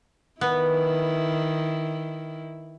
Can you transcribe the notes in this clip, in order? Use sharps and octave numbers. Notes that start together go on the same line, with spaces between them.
D#3 B3 E4